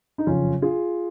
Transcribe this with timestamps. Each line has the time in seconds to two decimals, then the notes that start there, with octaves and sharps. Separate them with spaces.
0.18 D#4
0.27 F#1 F2 C#3 C#4 F4
0.62 F4 G#4